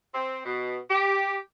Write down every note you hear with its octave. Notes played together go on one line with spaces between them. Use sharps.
C4
B2
G4